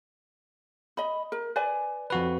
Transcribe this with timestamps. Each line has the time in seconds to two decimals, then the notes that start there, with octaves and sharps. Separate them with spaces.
0.97 D#5 B5
1.32 A#4
1.56 B4 D5 G#5
2.10 F2 F#4 B4